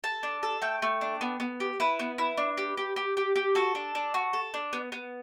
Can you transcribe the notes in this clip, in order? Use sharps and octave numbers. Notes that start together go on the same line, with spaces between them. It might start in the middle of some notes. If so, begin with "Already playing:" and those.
A4 A5
D4
A4
A3 G5
A3
D4
B3
B3
G4
E4 B4
B3
E4
D4
G4
G4
G4
G4
G4
F#4 A4
D4
D4
F#4
A4
D4
B3
B3